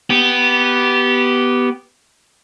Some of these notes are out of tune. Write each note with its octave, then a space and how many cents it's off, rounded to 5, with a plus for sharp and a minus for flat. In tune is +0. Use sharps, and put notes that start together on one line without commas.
B3 +0 G4 -10